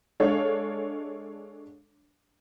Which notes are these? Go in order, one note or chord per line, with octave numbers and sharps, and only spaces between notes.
G#3 D4 A4 C#5 F5